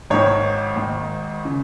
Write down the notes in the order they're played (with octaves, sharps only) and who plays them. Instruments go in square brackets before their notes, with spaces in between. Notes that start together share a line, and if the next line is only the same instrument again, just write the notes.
[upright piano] G#1 G#2 D#3 C#5
G#1 G#2 D#3
C#3